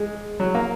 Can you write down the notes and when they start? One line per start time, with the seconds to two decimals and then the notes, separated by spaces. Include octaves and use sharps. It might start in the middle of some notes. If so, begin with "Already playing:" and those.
Already playing: G#3
0.40 F#3
0.55 A#3